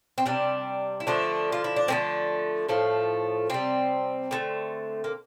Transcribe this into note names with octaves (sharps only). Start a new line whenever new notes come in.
C4
C3 G3 D4
E4
D3 F3 A3 D4
F4
E4
D4
D3 F3 A3 C4
A2 F3 A3
C3 G3 C4
D3 A3
A#3